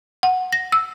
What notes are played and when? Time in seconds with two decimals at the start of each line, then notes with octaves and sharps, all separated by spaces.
0.23 F#5
0.53 A#6
0.72 E6